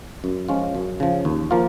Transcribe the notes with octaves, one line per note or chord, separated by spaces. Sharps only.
F#2
F3 G#3 C#4 F4
F#2
C#3 F3
D#2
F3 A#3 F4